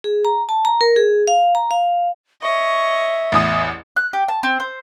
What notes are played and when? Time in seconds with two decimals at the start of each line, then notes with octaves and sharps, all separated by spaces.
0.04 G#4
0.25 A#5
0.49 A5
0.65 A#5
0.81 A#4
0.96 G#4
1.27 F5
1.55 A#5
1.71 F5
2.43 C#5 D#5 E5 C#6
3.32 A1 E2 D#6
3.96 F#6
4.13 G4
4.28 A5
4.43 C4
4.60 C5